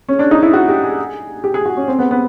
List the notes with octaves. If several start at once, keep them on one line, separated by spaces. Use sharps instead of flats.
C#4
D4
D#4
E4
F#4
G4
G#4
G4
G#4
F#4
C#4
C4
B3
B3